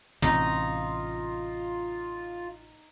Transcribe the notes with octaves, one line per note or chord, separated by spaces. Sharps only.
A1 C3 D#4 F4